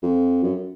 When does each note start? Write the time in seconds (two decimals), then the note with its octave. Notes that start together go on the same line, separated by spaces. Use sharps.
0.03 F2
0.43 F#2